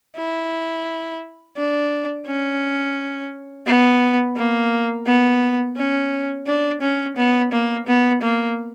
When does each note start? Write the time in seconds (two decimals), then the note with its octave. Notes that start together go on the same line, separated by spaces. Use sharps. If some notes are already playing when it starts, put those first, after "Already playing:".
0.16 E4
1.57 D4
2.26 C#4
3.66 B3
4.36 A#3
5.06 B3
5.76 C#4
6.46 D4
6.81 C#4
7.16 B3
7.52 A#3
7.87 B3
8.21 A#3